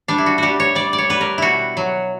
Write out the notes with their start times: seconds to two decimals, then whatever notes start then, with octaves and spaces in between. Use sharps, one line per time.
0.08 G3 D4
0.18 E4
0.26 F#4
0.38 G3 F#4 G4
0.60 C#5
0.75 G3 D5
0.93 D5
0.98 C#5
1.10 G3 B4
1.21 A#4
1.38 B2 E4 F#4
1.77 F#3